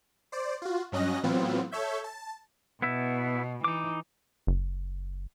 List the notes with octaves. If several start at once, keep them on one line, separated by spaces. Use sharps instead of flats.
C5 D5
F4 F#4
G2 F#3 C#4 D#5 F#6 A#6
A2 E3 F#3 B3 C4 F4
A4 C#5 E5 G6
A5
B2 B3 E4 E5
E3 D#4 D6
F#1